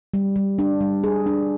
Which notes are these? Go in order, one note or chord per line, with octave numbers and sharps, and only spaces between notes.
G3
G3
D4
G3
G#4
D4